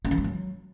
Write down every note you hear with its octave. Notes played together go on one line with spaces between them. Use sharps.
C#4
E3
G3
F#3